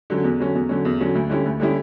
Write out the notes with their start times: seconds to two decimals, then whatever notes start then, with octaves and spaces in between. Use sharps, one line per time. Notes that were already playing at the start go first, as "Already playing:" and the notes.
0.10 D3 F#3 C#4
0.24 E2
0.39 D3 F#3 C#4
0.55 E2
0.69 D3 F#3 C#4
0.85 E2
1.00 D3 F#3 C#4
1.15 D2
1.30 D3 G3 C#4 E4
1.46 D2
1.60 D3 G3 C#4 E4